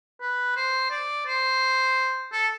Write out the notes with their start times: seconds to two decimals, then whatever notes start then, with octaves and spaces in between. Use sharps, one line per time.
0.20 B4
0.56 C5
0.91 D5
1.27 C5
2.32 A4